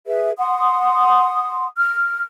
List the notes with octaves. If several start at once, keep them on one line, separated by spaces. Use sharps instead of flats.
G#4 B4 E5
F#5 C6 D#6
F6